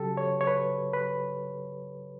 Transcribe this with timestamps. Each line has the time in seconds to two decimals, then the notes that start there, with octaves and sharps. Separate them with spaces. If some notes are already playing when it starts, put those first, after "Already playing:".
Already playing: C#3 F#3 G4 A4
0.17 C#5
0.41 C#5
0.47 B4
0.93 B4